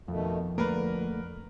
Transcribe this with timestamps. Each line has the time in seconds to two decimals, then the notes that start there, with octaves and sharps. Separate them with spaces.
0.08 F2 B2 D#3 A3
0.58 D3 A3 A#3 A#4 B4